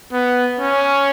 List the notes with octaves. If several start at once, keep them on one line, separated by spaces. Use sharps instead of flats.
B3
C#4